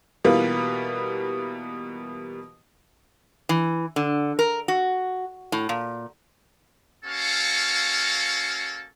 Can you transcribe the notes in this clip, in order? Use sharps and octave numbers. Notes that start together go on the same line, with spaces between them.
B2 E3 G3 A#3 F4 B4
E3
D3
A#4
F#4
A2
A#2
A#3 C#4 F#4 A4 F5